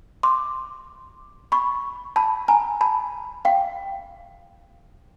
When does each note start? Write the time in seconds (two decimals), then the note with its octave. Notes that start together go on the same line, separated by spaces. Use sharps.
0.23 C6 D6
1.52 B5 C#6
2.16 A5 B5
2.48 G#5 A#5
2.81 A5 B5
3.45 F5 G5